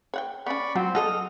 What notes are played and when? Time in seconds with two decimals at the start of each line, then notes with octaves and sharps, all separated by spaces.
0.14 C#5 F#5 G5
0.46 B3 C#4 D5 B5 C#6
0.76 F#3 C4 F4 C5
0.95 F#4 A4 D#5 D#6 F6